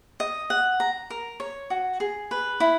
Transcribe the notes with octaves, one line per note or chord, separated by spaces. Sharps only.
D#5
F#5
A#5
A#4
C#5
F#4
G#4
B4
E4